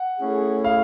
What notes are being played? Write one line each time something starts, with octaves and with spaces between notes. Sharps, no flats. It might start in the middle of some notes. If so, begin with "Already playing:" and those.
Already playing: F#5
A3 C#4 E4 G#4
F5